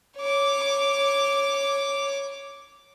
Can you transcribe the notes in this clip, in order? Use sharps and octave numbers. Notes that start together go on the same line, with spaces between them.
C#5 D6